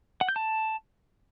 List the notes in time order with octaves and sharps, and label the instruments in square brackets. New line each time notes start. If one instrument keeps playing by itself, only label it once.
[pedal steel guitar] F#5
G6
A5